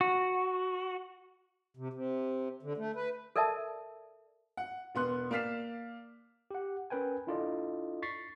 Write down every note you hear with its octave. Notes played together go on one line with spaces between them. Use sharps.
F#4
C3
C3
D3
A3
B4
A4 A#4 D5 E5 A5
F#5
E1 B3 C6 F#6
A#3 D5 F6 B6 C7 E7
G4 F#5
C#4 A#4 B4 G5 G#5
D4 E4 F4 A4 D5 D#5
C#6 A6 B6 C7